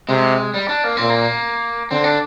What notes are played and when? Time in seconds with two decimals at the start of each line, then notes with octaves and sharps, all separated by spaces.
0.08 C3 G#3
0.54 G3
0.69 D4
0.84 A#3
0.97 A#2 C4
1.10 A#3
1.91 D3 C4
2.04 D4